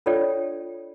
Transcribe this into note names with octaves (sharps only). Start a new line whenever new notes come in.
D4 F4 A4 C#5 D5 G5